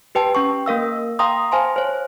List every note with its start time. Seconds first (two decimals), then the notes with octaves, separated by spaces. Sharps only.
0.15 G4 B4 G5 A5
0.35 C#4 G5 C#6
0.66 A#3 A#4 F5 E6
1.19 F5 G5 A#5 C6 D#6
1.52 C5 F5 G#5 A5 C6
1.76 C5 C#5